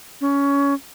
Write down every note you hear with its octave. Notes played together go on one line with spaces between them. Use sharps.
C#4